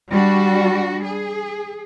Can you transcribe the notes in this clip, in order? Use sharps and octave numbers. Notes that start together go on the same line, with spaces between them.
G3 D4 F#4
G#4